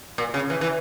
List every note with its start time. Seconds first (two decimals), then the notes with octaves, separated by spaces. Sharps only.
0.18 A#2
0.34 C#3
0.50 E3
0.61 E3